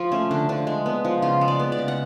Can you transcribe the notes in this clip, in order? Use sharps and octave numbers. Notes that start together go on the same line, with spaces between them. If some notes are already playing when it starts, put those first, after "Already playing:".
Already playing: F3 F4
A3 C#4
D3 D4
F3 D4
G#3
B3
F3
C#3 F4
G#3
D5
B3
D5
C#3
F#5